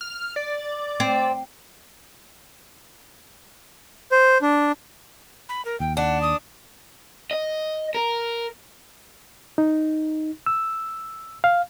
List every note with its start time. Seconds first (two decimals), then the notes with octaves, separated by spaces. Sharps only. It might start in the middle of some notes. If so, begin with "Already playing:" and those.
0.01 F6
0.36 D5
1.00 C4
4.12 C5
4.42 D4
5.49 B5
5.65 A#4
5.80 D#2 G5
5.97 D4 F#5
6.22 D#6
7.31 D#5
7.95 A#4
9.58 D#4
10.46 E6
11.44 F5